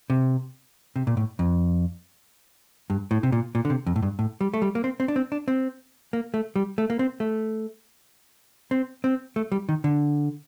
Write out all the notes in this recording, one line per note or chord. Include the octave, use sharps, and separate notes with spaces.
C3
C3
A#2
A2
F2
G2
A2
C3
A#2
A#2
D3
C3
F2
A2
G2
A2
G3
A3
G3
A#3
C4
C4
D4
C4
D4
C4
A#3
A3
G3
A3
A#3
C4
A3
C4
C4
A3
G3
D#3
D3